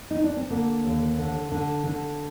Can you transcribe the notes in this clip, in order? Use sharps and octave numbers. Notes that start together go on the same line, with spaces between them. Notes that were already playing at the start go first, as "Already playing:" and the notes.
D#4
D4
C4
D3 A#3
D#2
D3
D3
D3